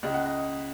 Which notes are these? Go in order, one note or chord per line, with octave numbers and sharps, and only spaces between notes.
C#2 C#3 D#5
F#5
D#5